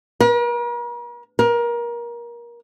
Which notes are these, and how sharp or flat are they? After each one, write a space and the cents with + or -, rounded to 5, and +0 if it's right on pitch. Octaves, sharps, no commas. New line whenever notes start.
A#4 +45
A#4 +25